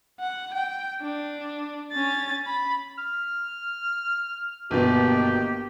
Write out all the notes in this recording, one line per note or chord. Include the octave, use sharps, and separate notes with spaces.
F#5
G5
D4
C#4 A6
B5
F6
G1 B2 D#3 A#3 G4